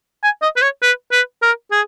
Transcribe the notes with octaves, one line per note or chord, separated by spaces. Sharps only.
G#5
D#5
B4
C#5
B4
B4
A#4
G#4